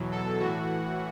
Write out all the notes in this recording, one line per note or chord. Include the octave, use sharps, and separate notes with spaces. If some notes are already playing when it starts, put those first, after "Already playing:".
Already playing: E2 B2 F#3
A4
A2 E3 F#4